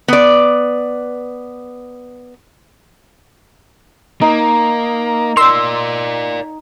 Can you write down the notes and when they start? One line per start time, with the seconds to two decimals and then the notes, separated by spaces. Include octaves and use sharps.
0.08 B3 D5
4.21 A#3 D#4
5.37 A#4 D5 C6 E6